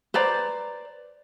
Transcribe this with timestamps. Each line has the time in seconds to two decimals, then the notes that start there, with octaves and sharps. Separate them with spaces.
0.14 B4 C5 D5 A#5